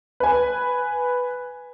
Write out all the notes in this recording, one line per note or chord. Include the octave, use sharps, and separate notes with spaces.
B4 G#5